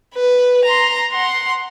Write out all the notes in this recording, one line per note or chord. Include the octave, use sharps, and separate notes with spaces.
B4
A#5 C6
F#5 C6